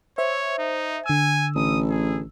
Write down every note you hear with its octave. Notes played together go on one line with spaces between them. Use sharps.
C5 C#5 E5
D#4
D3 G#5 E6
A1 D#6
G#4